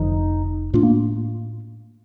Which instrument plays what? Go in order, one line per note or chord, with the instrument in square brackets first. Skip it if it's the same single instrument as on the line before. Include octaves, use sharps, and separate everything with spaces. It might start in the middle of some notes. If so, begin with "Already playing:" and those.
Already playing: [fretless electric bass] F1 F2 D3 F3 [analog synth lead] D#4
[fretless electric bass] A2 A3 D4 [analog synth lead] F4
[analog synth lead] A#3